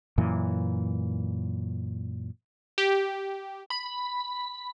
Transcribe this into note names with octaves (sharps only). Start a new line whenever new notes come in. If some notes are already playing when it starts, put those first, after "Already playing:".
F#2 A#2 E3
G4
B5